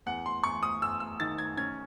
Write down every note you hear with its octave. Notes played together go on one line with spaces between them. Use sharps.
E2 F#5
C6
E2 C#6
D#6
E2 E6
E6
D#3 A6
G#6
C#4 G#6